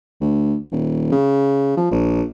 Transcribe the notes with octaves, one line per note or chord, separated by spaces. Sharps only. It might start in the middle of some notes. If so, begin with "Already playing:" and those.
D2
D#1
C#3
F3
A#1